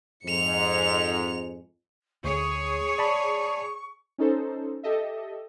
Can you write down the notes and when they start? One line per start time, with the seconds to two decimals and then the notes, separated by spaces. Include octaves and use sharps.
0.23 F2 G#2 C#7 F7
2.24 D2 G#4 C#5 C#6
2.98 D5 A5 B5
4.18 C#4 D#4 A4 C5
4.83 G4 A4 D#5 E5